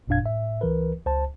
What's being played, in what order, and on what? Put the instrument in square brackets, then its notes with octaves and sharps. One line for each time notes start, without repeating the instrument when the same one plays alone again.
[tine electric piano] G1 F2 A#2 D4 F5 G#6
A2 E5
C#2 E3 A#4 B4
C#2 C5 A5